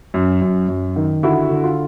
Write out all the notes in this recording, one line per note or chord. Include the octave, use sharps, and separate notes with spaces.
F#2
F#2
F#2
D#3
D3 E4 F#4
D3
F4